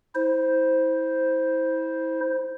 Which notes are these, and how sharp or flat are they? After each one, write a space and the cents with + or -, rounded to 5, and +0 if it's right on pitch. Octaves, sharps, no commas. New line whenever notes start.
E4 -25 C5 +0